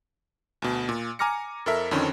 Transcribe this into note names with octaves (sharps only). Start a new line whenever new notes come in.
D2 B2
A#2
G#5 A#5 D6 F6 A#6 C#7
F2 A4 A#4 E5
F2 D3 D#3 C4 C#4